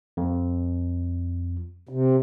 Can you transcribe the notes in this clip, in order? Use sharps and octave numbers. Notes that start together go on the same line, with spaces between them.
F2
C3